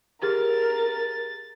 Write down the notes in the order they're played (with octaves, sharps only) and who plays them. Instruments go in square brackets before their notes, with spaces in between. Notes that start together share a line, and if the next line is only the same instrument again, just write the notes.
[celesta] G4 G#4 F6 [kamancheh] A#4 [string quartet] A6